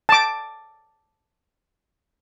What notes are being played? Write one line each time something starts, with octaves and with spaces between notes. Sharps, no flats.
A5 D6